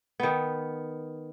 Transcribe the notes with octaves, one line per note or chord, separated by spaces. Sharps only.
D#3 B3